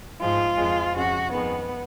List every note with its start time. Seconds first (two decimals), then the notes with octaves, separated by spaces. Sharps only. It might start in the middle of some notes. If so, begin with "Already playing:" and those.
0.21 G#2 F3 G#3 F4
0.57 F2 F3 G#3
0.95 F2 C#3 G#3 F#4
1.32 F2 D#3 G#3 B3